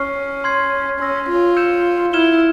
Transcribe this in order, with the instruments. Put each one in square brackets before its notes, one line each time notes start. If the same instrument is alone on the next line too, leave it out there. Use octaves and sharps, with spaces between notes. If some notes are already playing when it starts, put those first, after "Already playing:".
Already playing: [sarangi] C#4 [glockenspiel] C#6 F6 C7
[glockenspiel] C6 F6 G#6 C7
[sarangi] C#4 [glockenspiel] C6 E6 A#6
[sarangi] F4
[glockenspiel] E6 G6 C#7 E7
[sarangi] E4 [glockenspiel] F6 G#6 E7 G7